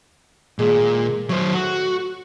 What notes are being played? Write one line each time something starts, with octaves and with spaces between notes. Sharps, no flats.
D#2 A#2 G#3 A5
E2 F#3 E4 C5
A2 F#4